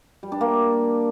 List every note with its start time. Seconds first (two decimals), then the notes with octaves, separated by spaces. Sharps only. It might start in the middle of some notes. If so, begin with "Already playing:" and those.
0.23 G3
0.32 D4
0.41 A#3